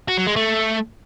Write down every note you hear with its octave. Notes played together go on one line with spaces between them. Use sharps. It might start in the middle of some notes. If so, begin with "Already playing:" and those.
F#4
F#3
G#3
A3